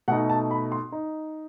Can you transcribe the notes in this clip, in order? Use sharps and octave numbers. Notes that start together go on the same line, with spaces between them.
B2 A3 D#4 F#5
A5
B5
C6
D#4